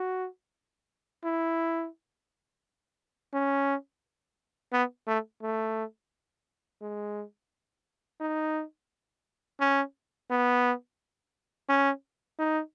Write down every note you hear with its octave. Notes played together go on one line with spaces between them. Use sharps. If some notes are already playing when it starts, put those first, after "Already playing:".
Already playing: F#4
E4
C#4
B3
A3
A3
G#3
D#4
C#4
B3
C#4
D#4